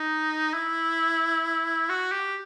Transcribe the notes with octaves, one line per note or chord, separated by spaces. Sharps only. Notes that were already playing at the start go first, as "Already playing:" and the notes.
Already playing: D#4
E4
F#4
G4